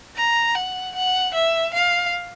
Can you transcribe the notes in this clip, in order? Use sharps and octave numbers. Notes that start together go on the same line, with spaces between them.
A#5
F#5
F#5
E5
F5